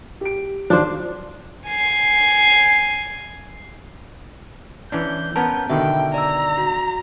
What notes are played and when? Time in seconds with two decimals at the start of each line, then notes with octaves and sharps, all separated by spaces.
0.21 G4 D7
0.70 D#3 F3 F#3 D4 C5 D5
1.68 G#5 C7
4.92 E3 C#4 D4 G6
5.36 B3 C#4 A#4 A5
5.70 B2 D3 D#3 E5 G5
6.14 D5 A#5 E6
6.58 F#4